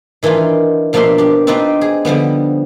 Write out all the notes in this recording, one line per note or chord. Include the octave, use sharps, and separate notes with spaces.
D#3 E3 D4 D#4 F4
B2 F3 A#3 D4 E5 C6
D4 G4
C4 D4 D#4 F4 B4 D5
G#4
D3 F3 G3 B3